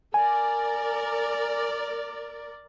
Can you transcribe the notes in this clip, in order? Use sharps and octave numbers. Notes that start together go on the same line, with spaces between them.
A#4 D5 G#5